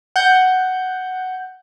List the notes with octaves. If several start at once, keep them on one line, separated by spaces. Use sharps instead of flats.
F#5 G6